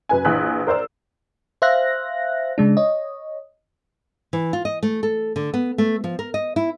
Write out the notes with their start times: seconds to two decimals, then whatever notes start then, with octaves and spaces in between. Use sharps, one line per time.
0.09 F#2 B4 G#5
0.25 A#1 E3 G#5 F#6 B6
0.67 A#4 C5 D5 E6
1.62 C5 E5 F5 F#6 A#6
2.58 C#3 G#3 D4
2.77 C#5 D#5
4.33 E3
4.53 F4
4.65 D#5
4.83 A3
5.03 A4
5.36 D3
5.54 B3
5.78 A3
6.04 F3
6.19 A#4
6.34 D#5
6.56 E4